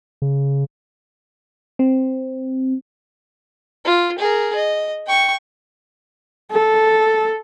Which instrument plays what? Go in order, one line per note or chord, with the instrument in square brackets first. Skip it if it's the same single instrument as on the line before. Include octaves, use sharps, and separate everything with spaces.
[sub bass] C#3
[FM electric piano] C4
[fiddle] F4
G#4 A#4
D#5
G5 C#6
[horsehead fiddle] A4